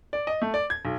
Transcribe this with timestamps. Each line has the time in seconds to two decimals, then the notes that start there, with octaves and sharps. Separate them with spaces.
0.13 D5
0.27 D#5
0.42 A3
0.54 D5
0.70 G#6
0.85 B1